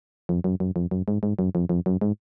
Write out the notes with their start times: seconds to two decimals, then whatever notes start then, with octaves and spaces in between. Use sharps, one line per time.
0.29 F2
0.44 F#2
0.60 F#2
0.76 F2
0.91 F#2
1.08 G#2
1.23 G#2
1.39 F#2
1.55 F2
1.69 F2
1.86 F#2
2.01 G#2